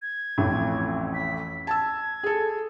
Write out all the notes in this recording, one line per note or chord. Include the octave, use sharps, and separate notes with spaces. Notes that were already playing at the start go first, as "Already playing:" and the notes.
G#6
A1 F2 A2
B6
A5 E6 G#6
G#4 A4